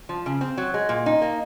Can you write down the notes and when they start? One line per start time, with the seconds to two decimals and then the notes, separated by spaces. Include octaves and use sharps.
0.09 F3
0.26 C#3
0.41 C4
0.58 F#3
0.74 G#3
0.89 A#2
1.06 D#4
1.21 A#3